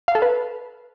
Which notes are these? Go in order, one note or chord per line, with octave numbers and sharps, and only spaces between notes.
F5
A4
B4